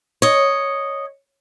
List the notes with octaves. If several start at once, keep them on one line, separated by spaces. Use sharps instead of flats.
C#5 D#5